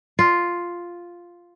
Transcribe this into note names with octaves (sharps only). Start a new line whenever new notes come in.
F4